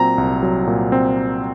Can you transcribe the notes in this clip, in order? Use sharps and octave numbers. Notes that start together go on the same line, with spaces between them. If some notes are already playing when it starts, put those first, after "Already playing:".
Already playing: A#2 F#3 C4 A#5
C2
F#3
A#2
C4